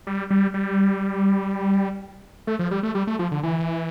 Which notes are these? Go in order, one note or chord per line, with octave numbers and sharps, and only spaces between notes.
G3
G3
G3
A3
F3
G3
A3
G3
A3
F3
D3
E3